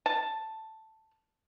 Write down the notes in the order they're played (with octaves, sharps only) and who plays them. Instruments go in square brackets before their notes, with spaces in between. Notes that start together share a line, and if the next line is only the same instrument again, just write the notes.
[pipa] A5